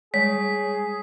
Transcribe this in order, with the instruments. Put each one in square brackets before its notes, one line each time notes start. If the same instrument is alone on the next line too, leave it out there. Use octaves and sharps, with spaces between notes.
[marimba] G3 G#3 [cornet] G#4 [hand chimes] C#5 [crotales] B6